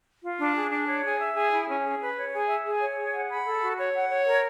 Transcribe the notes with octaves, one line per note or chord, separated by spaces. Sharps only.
F4
D4
G#4
D4
C#5
G#4
E5
G#4
E4
C#4
G#4
B4
C#5
G#4
E5
G#4
C#5
G#4
F#5
B5
A4
F#4
C#5
F#5
C#5
A#4